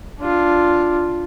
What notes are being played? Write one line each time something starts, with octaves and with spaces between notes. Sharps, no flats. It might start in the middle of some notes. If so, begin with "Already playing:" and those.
D4 F4